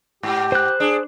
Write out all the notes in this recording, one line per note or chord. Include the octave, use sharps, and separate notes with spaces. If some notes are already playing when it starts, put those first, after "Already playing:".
G#2 G4
C5 F#6
D4 G#4